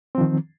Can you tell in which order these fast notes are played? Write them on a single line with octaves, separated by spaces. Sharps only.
C4 F3 D#3